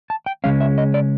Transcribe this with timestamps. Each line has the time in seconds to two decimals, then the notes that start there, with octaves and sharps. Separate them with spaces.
0.10 A5
0.26 G5
0.44 C#3 F3 G#3 C#4 F5
0.61 E5
0.78 D#5
0.94 D5